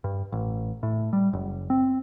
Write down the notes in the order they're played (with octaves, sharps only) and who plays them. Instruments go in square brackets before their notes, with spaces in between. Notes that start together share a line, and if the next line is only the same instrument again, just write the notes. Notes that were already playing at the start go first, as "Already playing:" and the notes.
[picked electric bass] G2
A1
A2
G3
F#1
C4